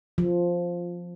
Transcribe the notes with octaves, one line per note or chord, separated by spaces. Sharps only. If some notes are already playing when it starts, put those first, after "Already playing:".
F3